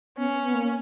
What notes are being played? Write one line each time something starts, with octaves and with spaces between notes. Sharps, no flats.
B3 C#4
B3
B3
A#3